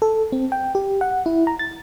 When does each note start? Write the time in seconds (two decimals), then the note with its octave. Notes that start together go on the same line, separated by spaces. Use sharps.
0.02 A4
0.32 C4
0.52 G5
0.75 G4
1.01 F#5
1.26 E4
1.47 A#5
1.59 A6